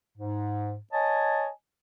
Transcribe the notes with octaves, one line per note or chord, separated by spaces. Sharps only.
G#2
C#5 D#5 G#5 A5